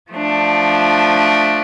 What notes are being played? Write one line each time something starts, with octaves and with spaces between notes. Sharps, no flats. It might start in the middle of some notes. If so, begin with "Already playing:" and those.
F3 A3 D4